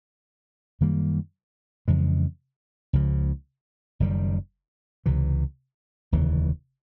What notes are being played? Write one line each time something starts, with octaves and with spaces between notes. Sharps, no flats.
F#2 D#3 G3 A#3
F2 C#3 E3 G#3
C#2 C#3 F3
F#1 F#2 D#3 G3
C#2 C3 E3
F1 D#2 C#3 E3